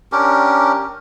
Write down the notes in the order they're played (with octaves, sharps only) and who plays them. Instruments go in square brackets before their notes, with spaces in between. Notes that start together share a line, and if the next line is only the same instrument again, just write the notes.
[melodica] C#4 D4 G4 A#4